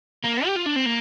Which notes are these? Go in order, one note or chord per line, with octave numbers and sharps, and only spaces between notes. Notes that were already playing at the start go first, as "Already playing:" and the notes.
A#3
G4
F4
D4
C4
A#3